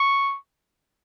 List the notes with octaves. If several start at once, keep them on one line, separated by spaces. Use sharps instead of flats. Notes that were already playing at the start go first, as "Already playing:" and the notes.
Already playing: C#6